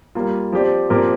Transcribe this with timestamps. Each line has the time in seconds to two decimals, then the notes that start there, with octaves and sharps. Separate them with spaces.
0.15 G3 A#3 F4
0.52 F3 C4 G4 D5
0.90 A#2 F3 C4 G4 A#4